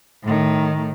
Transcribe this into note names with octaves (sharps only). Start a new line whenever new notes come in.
A2 D#3